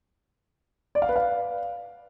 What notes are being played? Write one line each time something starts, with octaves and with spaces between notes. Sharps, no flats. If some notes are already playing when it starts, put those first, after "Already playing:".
D5
F5
B4
F5